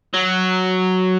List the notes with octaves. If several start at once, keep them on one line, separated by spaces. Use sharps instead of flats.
F#3